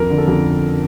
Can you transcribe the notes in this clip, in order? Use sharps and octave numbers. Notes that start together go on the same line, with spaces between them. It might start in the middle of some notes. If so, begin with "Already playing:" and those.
Already playing: F2 A#4
D3
A4
F2